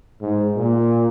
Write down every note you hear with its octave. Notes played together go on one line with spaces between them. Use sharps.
G#2
A#2